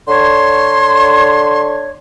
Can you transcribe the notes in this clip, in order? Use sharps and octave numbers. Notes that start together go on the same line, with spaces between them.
D3 C#5 C6